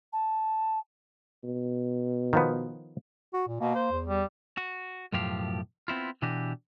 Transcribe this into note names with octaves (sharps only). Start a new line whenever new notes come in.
A5
B2
D#3 F3 B3
F#4
A#2
B2 A#3
C5
E2
G3
F#4
B1 F#2 A2 F3 G4 F5
B3 C4 E4 F4
B2 E3 D4 F#4 G4